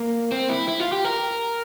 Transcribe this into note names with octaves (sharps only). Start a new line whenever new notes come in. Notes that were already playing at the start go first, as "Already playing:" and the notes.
Already playing: A#3
C4
E4
E4
F4
G4
A#4